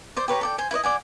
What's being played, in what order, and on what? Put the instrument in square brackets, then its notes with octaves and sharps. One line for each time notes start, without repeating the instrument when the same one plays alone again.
[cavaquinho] C5 D5
G4 B4 C#5 A#5
A4 D5 G5
C5 G#5
E4 B4 C#5 D#5
D5 F#5 G#5